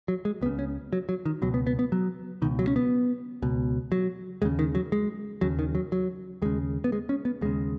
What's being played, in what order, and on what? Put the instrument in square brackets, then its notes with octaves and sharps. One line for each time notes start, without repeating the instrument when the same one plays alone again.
[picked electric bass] F#3
G#3
C#2 B3
C#3
C#4
F#3
F#3
D#3
C#2 B2 F#3
B3
B3
B3
F#3
C#2 B2 D#3
F#3
C#4
B3
C#2 B2
F#3
D#2 C#3 G#3
D#3
F#3
G#3
D#2 C#3 F#3
D#3
F#3
F#3
D#2 C#3 G#3
B3
G#3
C#4
B3
D#2 C#3 G#3